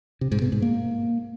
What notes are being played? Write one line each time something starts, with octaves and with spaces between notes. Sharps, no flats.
C3
G#2
B2
G#2
A#3